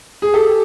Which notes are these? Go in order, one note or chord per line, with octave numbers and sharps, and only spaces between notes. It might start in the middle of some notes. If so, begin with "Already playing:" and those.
G#4
G4 A4